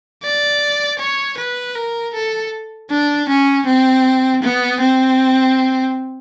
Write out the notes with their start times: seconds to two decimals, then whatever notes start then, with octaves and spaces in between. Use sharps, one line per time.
0.23 D5
1.00 C#5
1.38 B4
1.75 A#4
2.14 A4
2.90 D4
3.28 C#4
3.66 C4
4.43 B3
4.81 C4